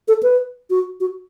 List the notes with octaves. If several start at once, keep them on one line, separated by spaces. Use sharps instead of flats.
A4
B4
F#4
F#4